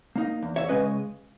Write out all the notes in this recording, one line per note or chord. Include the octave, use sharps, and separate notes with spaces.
A#3 D#4
E2
C#5 E5
C#3 G#3 C#4 B4 D#5